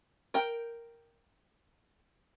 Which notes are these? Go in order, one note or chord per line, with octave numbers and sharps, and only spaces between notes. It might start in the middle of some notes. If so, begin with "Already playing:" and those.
A#4 G5